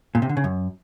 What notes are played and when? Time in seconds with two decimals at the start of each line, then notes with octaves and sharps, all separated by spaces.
0.15 A#2
0.22 C3
0.29 D3
0.37 C#3
0.44 F#2